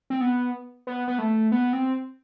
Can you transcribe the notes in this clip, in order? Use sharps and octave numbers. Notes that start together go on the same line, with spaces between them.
C4
B3
B3
B3
A3
B3
C4